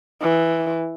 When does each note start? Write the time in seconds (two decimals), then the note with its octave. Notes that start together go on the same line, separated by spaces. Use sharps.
0.21 E3